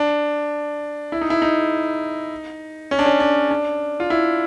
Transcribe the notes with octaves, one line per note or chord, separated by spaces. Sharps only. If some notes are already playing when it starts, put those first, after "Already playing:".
Already playing: D4
E4
D#4
E4
D#4
C#4
D4
C#4
D4
D4
F4
E4